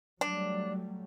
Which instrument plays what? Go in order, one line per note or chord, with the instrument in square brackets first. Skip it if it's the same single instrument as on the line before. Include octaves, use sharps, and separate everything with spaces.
[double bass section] F#3 G3 A3 [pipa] D4